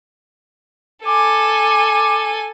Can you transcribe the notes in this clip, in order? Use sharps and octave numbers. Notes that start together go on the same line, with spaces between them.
A4 G#5 D6